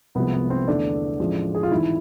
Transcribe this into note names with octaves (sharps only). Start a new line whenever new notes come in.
C2 C3 F3 G#3 B3
B3
C4
E2 D3 A3 D4
A1 A2 F3 G#3
G#4
F4
G#1 G#2 E3 E4